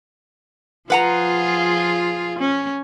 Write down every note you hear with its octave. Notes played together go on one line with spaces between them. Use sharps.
F3 F4 G#4 B4 F#5 A#5
C#4